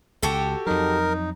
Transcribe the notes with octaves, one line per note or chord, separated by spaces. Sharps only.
C#2 F#4 G4 A4
F2 F#3 D#4 A#4